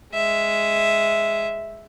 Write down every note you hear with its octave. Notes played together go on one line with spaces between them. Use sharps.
G#3 E5